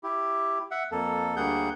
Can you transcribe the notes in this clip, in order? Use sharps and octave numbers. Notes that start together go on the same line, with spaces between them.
E4 G4
E5 F#5
F2 A#3 A4
D2 G3 A#3 G#4 F#5 G6